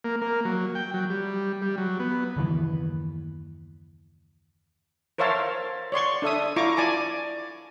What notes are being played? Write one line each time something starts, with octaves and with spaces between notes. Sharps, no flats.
A#3
A#3
F#3
G5
F#3
G3
G3
F#3
B3
F#1 D#2 E3
A#4 C5 C#5 E5 F5 A5
C#5 D5 C6 C#6
D4 A4 E5 D#6
E4 F4 A#5 C#6 D6
D5 G#5 A5 D6